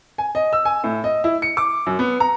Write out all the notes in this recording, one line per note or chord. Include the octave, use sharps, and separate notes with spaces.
G#5
D#5
E6
G#5
A2
D#5
E4
C#7
D6
F#2
B3
A#5